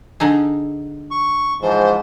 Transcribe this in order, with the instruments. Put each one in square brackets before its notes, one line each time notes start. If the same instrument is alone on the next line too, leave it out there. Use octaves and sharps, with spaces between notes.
[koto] D3 D#4 G#4
[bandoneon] C#6
[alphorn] G#2 [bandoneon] E3 F3 [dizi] C5